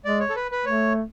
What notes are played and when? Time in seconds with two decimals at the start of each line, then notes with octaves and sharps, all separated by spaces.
0.05 G#3 D5
0.20 C#5
0.30 A4
0.36 B4
0.51 B4
0.66 A3 C#5